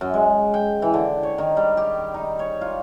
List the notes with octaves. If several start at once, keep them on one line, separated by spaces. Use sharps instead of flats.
F#2
G#3
G5
E3
D3
C#5
D#3
G3
G4
D#4
C#5
F4